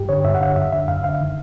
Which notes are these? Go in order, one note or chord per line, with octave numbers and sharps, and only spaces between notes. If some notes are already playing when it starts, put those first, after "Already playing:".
Already playing: G2 G4
D3 C#5
G2 E5
F#5
D3 F5
F#2 E5
D3 E5
F#2 F5
D3 F5
D#3